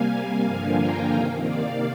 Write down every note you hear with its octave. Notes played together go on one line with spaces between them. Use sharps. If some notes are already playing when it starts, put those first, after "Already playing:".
Already playing: C3 G3 A#3 F5 G#5
F5 G#5
G2 D3 F3 A#3
G5 A#5
C3 D#3 A#3
D5 F5